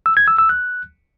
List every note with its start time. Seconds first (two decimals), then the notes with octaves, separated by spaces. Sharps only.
0.06 E6
0.17 G#6
0.28 E6
0.38 E6
0.49 F#6